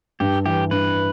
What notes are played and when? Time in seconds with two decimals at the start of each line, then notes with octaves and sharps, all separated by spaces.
0.20 G2 G4
0.46 E3 G4
0.71 G2 B4